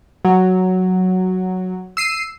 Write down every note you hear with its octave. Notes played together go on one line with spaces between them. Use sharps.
F#3
E6 C7 D#7